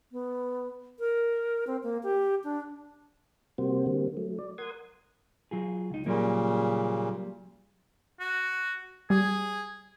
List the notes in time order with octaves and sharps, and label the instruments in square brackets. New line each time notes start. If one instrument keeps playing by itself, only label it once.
[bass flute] B3
A#4
C4
A#3
G4
D4
[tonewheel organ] C3 G3 A#3 C4 F#4 C5
D3 G3 A#3 C4
F#3 A3
D5
A#4 F#5 C6 D#6 G#6
[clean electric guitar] F#3 F4 G#4
C#2 D#4
[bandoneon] A#2 C#3 [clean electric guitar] F#3 G3 A#3
[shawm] F#4
[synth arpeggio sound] G3 [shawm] G#4